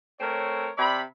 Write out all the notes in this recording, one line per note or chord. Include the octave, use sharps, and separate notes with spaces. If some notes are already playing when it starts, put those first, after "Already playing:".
A3 C4 A#4 C#5
C3 D5 E5 B5